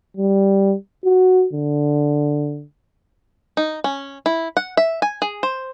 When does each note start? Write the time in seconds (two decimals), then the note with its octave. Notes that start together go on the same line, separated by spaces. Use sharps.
0.17 G3
1.05 F#4
1.53 D3
3.57 D#4
3.84 C#4
4.26 E4
4.57 F#5
4.77 E5
5.02 G#5
5.22 G#4
5.43 C5